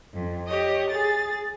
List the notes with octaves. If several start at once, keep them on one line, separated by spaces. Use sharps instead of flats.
F2
G4 C#5 D#5
G#4 A6